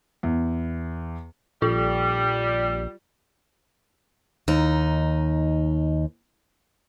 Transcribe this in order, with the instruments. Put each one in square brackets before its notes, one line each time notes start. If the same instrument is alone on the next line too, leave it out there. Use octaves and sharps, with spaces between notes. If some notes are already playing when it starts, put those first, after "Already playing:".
[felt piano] E2
[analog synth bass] A#1 [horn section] G3 [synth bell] F4
[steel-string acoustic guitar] D#2 D#4